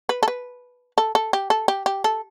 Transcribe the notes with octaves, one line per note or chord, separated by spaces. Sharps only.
B4
A4
B4
A4
A4
G4
A4
G4
G4
A4